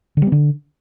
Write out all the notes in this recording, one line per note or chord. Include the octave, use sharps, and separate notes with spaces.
D3
G3
B3
D3